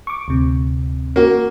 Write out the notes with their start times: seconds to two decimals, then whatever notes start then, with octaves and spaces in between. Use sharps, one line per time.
0.07 C#6 D6
0.28 D2 C3
1.16 A#3 C#4 F#4